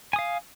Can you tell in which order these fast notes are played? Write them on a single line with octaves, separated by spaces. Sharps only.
G#5 D#6 F5